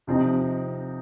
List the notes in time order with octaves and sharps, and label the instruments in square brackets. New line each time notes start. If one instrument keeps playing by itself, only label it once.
[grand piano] C3 F3 C4 D#4